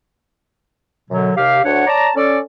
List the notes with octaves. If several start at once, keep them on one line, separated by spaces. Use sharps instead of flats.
F#2 B2 D3 F#3
D#2 C3 G4 F5
D2 D4 C#5 F#5
C#5 D5 A5 A#5
C#4 A4 D5